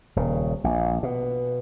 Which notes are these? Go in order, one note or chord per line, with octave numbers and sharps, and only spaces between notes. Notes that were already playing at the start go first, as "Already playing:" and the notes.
D#1 C#3
A#1
B2